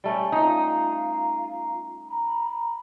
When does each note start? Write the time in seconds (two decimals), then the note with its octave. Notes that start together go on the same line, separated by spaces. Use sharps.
0.04 G3 A3 C#4
0.32 D#4 F4 F5 A#5
2.08 A#5 B5